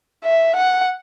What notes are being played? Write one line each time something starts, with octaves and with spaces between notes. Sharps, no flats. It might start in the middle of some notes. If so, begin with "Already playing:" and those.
E5
F#5